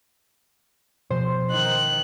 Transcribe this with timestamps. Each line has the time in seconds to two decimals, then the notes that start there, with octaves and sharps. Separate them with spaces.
1.10 B2 F3 C5
1.50 D#3 F#6